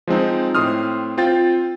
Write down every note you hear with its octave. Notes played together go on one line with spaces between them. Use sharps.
F3 G#3 C4 D#4
A2 C4 C6 D#6 F6
C4 F4 G5 A6